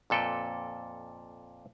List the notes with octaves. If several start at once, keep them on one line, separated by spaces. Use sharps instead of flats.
F2 A#2 A4 B4 G5